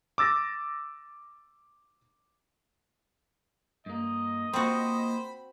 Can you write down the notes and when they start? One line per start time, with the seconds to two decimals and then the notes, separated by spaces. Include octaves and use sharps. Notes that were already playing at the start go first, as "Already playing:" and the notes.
0.18 D6 E6 A6 A#6
3.86 G2 A#3 D#5
4.53 A#3 C4 F4 F#4 C5 B5